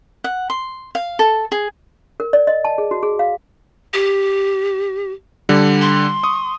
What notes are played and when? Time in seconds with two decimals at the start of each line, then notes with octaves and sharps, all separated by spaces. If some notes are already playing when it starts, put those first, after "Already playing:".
0.24 F#5
0.50 C6
0.95 F5
1.19 A4
1.52 G#4
2.20 A#4
2.33 D5
2.47 D#5
2.65 A5
2.78 G#4
2.91 F#4
3.03 G#4
3.19 F5
3.93 G4
5.49 D3 G3
5.81 C6
6.23 C#6 D#6